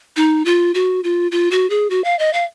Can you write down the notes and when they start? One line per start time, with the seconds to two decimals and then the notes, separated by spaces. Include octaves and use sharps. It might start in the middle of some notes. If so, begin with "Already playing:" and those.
0.17 D#4
0.46 F4
0.75 F#4
1.04 F4
1.32 F4
1.51 F#4
1.70 G#4
1.90 F#4
2.04 F5
2.19 D#5
2.33 F5